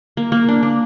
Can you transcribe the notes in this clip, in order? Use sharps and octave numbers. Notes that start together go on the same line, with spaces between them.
A#3
A#3
D4
D4